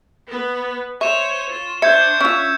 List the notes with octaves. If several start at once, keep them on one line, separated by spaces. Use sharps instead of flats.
B3 B4
C5 C#5 E5 C#6 E7
F4
D4 C5 E5 G6 G#6 C#7
C#4 F4 E5